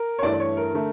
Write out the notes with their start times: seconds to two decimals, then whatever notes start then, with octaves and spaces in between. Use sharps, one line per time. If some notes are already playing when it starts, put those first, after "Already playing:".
Already playing: A#4
0.19 C#5
0.22 G2 E3 A3 D5
0.34 D5
0.40 C#5
0.57 A#4
0.74 D3 A3